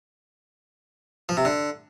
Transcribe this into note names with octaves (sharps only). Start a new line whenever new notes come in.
F3
C3
D3